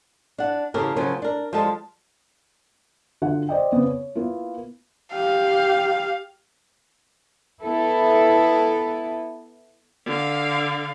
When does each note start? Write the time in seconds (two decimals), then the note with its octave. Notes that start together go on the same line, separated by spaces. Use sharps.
0.38 D4 F#5
0.74 E2 C#3 A#3 G4 A4 A#4
0.96 C#3 F3 F#3 A#3 C#4
1.22 D4 A#4
1.53 F3 G3 G#3 A4 A5
3.22 D3 F4 F#4 F#5
3.49 C5 D5 D#5 G5
3.72 C#3 B3 C4
3.86 C#5
4.15 A#3 B3 E4 F4
5.15 G4 F5
7.62 B3 E4 A4
10.06 D3 F5